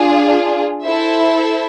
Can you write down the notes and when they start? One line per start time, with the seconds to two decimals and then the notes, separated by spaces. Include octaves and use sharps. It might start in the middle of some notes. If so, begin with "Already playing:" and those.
Already playing: D4 F4 G#4
0.84 E4 A4 C5 E5